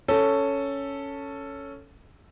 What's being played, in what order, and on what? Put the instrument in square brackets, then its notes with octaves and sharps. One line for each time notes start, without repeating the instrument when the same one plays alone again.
[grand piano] C#4 A4